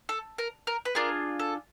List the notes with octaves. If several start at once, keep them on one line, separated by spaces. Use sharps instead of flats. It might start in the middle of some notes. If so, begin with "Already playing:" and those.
A4
A#4
A#4
B4
D4 F4 G#4 A#4
A4